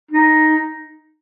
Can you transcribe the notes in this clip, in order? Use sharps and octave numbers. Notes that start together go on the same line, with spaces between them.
D#4